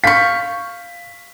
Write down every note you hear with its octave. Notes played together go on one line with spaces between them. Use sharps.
F5 C#6 G6 B6